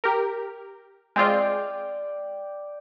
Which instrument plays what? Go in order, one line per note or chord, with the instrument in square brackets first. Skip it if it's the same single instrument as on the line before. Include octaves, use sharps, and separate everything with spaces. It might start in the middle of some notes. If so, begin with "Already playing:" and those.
[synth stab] G4 A#4
[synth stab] G#3 C4 F4 [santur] D5 G5